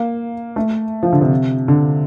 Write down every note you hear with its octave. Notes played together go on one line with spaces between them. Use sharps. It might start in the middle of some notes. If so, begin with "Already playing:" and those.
Already playing: A#3
A3
F3
D3
C3
D3